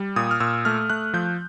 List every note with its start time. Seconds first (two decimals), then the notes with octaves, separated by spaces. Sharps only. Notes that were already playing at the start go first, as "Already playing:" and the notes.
Already playing: G3
0.16 A#2 D#6
0.31 F6
0.40 A#2 E6
0.65 A3 F6
0.90 A3 F#6
1.14 F3 G6